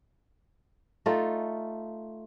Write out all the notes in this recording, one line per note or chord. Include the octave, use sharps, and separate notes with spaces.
A3 D#4 F4 A4